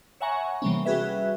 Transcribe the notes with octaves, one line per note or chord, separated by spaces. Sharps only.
C#5 E5 F#5 G#5 A#5 C#6
C3 E3 G3 A#3 B3 C#4
G3 C#4 F#4 G#4 B4 E5